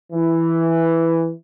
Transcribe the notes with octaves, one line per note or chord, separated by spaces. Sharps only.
E3